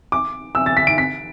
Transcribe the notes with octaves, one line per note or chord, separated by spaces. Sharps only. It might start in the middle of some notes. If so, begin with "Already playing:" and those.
D6
E6
A6
B6
D7
B6